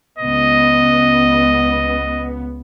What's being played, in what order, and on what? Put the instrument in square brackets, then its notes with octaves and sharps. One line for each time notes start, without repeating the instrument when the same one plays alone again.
[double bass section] C#2 B3 [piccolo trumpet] D#5